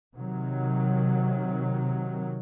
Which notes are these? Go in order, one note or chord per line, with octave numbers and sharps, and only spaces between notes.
C3 D#3 F#3